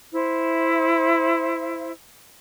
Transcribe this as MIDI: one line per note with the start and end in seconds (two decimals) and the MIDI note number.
0.14 1.92 64
0.14 1.92 72
0.14 1.92 76